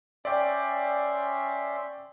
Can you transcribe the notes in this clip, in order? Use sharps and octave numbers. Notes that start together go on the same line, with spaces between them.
C#4 D5 E5 G5 C6